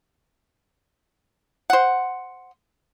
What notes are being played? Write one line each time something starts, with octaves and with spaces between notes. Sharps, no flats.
C5 F#5